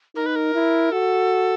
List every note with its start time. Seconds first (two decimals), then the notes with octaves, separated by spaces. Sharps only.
0.15 D#4 A#4
0.26 B4
0.35 A#4
0.55 E4
0.92 F#4 A4